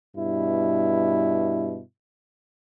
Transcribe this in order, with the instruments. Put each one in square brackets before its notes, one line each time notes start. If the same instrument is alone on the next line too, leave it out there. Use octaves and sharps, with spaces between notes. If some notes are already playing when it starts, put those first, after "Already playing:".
[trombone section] G2 B2 E4